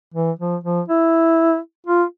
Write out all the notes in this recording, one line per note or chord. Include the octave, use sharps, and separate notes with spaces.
E3
F3
F3
E4
F4